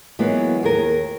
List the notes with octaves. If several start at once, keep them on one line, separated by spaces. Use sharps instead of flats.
E3 F#3 G#3 A#3 B3
D#2 G#4 A#4